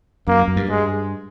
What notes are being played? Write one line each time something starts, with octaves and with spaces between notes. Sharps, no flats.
F#2 A#3
F#2
G2
G#3